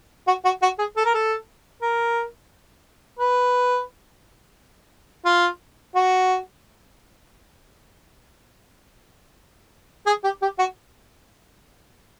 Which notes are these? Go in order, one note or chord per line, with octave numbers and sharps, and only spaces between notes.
F#4
F#4
F#4
G#4
A4
A#4
A4
A#4
B4
F4
F#4
G#4
G4
G4
F#4